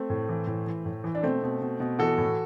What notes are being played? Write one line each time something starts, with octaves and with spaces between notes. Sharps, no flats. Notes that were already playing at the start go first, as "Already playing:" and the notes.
Already playing: A3 C4
A2
E3
A2
E3
A2
E3
D4
B2 A3 C4
B2
B2
B2
E3 F#4 A4
A2